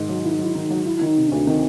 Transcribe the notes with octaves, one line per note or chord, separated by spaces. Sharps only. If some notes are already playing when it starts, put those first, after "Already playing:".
Already playing: G#2 D#3
F#3
D#3 E4
D#4
F#3
E4
D#3 D#4
F#3
D#3 E4
D#3 E4
D#4
C3
D2 D4
D#3 C4